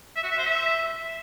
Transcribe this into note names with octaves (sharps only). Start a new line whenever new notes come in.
E5
F#4
E5
C5
E5